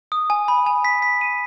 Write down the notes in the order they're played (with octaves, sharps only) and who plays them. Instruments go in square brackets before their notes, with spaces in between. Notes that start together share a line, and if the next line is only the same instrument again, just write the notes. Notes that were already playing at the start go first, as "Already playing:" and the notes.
[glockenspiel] D#6
G#5
B5
G#5
B6
B6
D#7